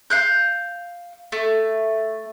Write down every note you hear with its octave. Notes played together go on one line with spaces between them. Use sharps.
F5 F#6 G6
A3